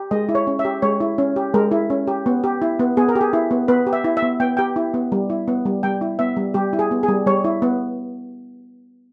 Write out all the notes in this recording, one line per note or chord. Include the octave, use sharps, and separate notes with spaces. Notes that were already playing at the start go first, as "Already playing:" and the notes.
Already playing: G4
G#3 D#5
E4
C#5
C#4
E5
G4
G#3 C#5
E4
C#4
G4
G#3 A#4
E4
C#4
G4
B3
G4
E4
B3
B3 G#4
A#4
G4
G#4
E4
B3
B3 B4
G4
E5
E4
E5
B3
B3 G5
G4 G5
E4
B3
G3
E4
B3
G3
G3 G5
E4
B3 E5
G3
G3 G4
E4
G#4
B3
G#4
G3
G3 C#5
E4
B3